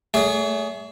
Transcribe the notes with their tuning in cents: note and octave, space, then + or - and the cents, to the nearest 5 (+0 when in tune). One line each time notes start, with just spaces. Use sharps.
A3 +0 G#4 +0 C#5 +45